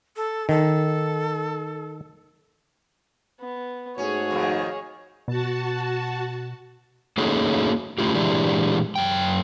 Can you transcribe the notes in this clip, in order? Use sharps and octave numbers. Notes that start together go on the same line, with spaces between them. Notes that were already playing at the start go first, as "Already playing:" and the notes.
A4
D#3 A4
B3
G#2 A3 C#4 F#4 G#4 C#5
F2 B2 D#3
B2 F#4 A5
A3 A#3 C#4 D#4 F#4 G#4
A3 C#4 E4 F4 G4
A#2 E3 G#3 D4 E4 G4
F#2 G5